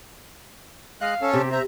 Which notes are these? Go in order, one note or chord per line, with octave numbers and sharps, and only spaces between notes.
G#3 D#5 F5 F#6
C#4 A4
C3 G4
C5 E5 A#5